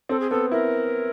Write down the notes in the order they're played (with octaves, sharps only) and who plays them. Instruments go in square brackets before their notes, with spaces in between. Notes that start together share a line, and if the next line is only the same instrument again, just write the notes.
[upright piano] C4 [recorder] A4
[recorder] G#4
[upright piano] B3 [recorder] A4
[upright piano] E4 [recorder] A#4